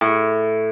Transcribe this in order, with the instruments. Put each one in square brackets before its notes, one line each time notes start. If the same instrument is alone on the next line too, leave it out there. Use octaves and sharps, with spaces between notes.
[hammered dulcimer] A2